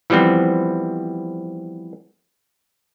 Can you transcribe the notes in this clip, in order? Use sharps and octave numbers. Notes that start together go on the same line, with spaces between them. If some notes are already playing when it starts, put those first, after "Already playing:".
E3 F3 G3 B3 C4